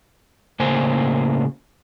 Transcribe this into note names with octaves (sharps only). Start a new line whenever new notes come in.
A2 C#3 A#3 C5 G#5